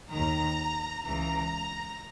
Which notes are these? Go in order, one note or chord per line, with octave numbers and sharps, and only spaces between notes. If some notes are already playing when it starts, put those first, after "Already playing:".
D#2 D#3 A#5
C#2 C#3 E3 A#5